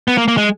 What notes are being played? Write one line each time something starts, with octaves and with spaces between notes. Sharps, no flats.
B3
A#3
A#3
G#3